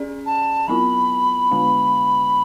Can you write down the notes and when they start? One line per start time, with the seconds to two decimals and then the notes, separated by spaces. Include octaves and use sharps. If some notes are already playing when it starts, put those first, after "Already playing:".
Already playing: C#4 G#4 D5
0.26 A5
0.67 F#3 B3 E4 B5
1.51 D3 G#3 B3